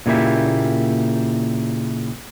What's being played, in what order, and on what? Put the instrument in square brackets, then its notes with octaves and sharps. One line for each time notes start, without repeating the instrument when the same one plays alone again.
[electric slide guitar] A#2 C#3 A#3 E4 G4